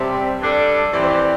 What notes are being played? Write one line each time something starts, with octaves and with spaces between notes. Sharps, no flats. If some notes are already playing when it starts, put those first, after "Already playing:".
Already playing: C3 G3 C4 E5 A5
G2 G3 D4 A4
E3 C4 G4 D5
C5
D5